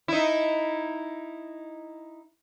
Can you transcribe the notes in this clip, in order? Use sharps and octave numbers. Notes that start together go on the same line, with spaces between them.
D#4 E4